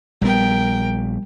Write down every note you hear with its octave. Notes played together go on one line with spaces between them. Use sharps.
A#1 G3 B3 A#4 G5